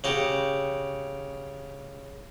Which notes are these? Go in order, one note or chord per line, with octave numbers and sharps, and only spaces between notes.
C#3 F#4 G4